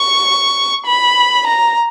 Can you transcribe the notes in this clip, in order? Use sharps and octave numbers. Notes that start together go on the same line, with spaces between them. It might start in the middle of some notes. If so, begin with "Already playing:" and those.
Already playing: C#6
B5
A#5